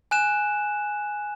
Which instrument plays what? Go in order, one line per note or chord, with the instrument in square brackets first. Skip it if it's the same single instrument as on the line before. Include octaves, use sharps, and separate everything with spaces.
[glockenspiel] G#5 F#6 E7